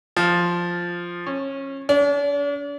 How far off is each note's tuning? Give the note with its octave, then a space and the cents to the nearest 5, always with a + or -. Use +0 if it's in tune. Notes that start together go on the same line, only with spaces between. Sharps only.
F3 +0
C#4 -25
D4 -45